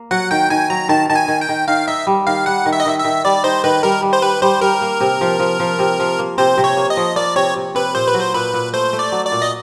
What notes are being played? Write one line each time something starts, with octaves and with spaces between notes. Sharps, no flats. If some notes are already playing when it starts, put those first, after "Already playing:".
Already playing: A#3
F#3 F#5
D#3 G5
D#3 G#5
F#3 A#5
D#3 A5
D#3 A5
G#5
D#3
G5
D#3
D#3 F5
D#4 E5
G3
D#3 F5
G3 F#5
D#3
E5
D#5
D#3 E5
E5
D#3
G3 D5
D#4 C5
D#3 B4
G3 A#4
G3
C5
G3 B4
G3 C5
G3 A#4
A#3
C3
F3
F3
F3
C3
F3
A#3
C3 C5
C3
C#5
A#3
D#5
F3
A#3 D5
C3 C#5
C3
C3 B4
A#2 C5
B4
F#3
C5
A#2 B4
A#2
A3 C5
A3
D5
F#3
D5
A#2
D#5